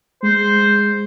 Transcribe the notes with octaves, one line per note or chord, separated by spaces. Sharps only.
G#3 C5